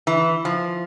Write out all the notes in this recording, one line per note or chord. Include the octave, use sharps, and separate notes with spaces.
E3
F3